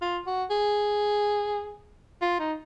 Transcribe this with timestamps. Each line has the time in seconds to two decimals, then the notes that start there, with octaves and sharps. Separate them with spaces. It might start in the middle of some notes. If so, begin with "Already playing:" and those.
0.02 F4
0.27 F#4
0.51 G#4
2.22 F4
2.40 D#4